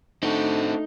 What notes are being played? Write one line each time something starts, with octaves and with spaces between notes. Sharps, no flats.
A3 C4 D4 D#4 F#4